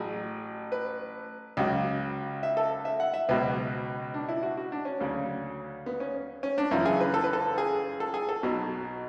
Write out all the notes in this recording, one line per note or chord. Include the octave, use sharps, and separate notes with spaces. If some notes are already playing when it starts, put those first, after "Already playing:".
Already playing: A1 A2 F#3 G#4
B4
C#2 C#3 F#3
E5
A4
E5
F#5
E5
C#2 B2 F#3 B4
D4
E4
F#4
F#4
D4
C#4
D2 C#3 F#3
B3
C#4
C#4
D4
F#2 C#3 E3 E4
G#4
B4
A4
B4
A4
G#4
A4
G#4
A4
B1 B2 F#3